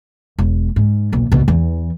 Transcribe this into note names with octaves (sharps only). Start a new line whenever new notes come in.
E1
G#2
D#1 B1
C2 B2
E2 E3